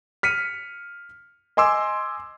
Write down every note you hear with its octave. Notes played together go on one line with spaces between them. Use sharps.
F6 B6 C#7 D#7
D#5 G#5 C6 D6 E6